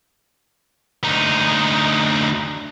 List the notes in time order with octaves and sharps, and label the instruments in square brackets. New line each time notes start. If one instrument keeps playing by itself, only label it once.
[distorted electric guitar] D2 D#4